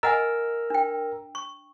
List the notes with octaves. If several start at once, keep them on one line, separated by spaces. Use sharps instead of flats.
A#4 D#5 F#5 G#5 A#5 E6
D4 G5
C#6